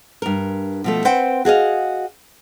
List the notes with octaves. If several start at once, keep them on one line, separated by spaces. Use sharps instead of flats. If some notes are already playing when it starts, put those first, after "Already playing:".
G2 A#4
B2 F3 A3
C4 B4 C5 F#5 G5
F#4 G#4 D#5 F5